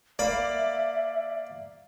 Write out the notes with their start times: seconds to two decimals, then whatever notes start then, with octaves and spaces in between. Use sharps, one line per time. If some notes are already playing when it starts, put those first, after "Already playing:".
0.19 A#3 D5 E5 B5